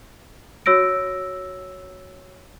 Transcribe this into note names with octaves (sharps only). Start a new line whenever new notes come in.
F#4 C#5 E6 A#6 D7